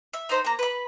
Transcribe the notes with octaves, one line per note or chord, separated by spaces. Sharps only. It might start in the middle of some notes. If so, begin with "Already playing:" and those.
E5
D#4 C5 A#5
A#3 A#5
B4 B5